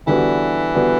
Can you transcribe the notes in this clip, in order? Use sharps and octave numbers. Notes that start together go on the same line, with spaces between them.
D3 E3 G3 B3 F#4
D3 G3 B3 F#4